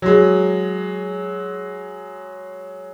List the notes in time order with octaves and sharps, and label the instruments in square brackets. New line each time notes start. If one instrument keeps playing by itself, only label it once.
[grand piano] F#3 G#3